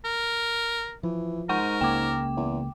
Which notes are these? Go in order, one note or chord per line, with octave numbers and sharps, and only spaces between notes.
A#4
E3 F3
G#2 A#4 F#5 C#6
C#2 C#3 A#3 G5 D6
E2